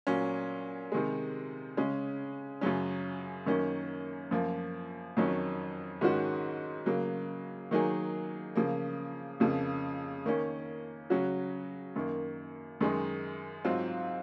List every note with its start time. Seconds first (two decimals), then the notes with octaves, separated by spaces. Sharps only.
0.07 A#2 F#3 C#4
0.92 C3 D#3 G#3
1.77 C#3 G#3 C#4
2.61 F#2 C#3 F#3 C#4
3.46 F#2 D#3 F#3 A#3 C#4
4.31 F#2 F3 A#3
5.17 F2 D#3 F#3 C#4
6.01 G#2 D#3 G#3 C#4 F#4
6.86 C#3 F#3 A#3
7.71 D#3 F#3 A#3 D#4 G#4
8.55 C#3 F3 A#3
9.40 F2 C#3 F3 A#3
10.26 D#3 A#3 C#4
11.10 C#3 F#3 C#4 F#4
11.96 F#2 D#3 A#3
12.81 F#2 D#3 G#3 D#4
13.65 G#2 F#3 C4 F4